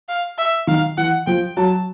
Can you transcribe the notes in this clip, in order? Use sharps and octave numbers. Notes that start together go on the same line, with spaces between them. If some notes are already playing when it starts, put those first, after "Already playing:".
F5
E5
D#3 F5
E3 F#5
F3 G5
F#3 A5